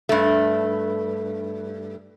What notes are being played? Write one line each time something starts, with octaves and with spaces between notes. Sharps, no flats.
G2 A3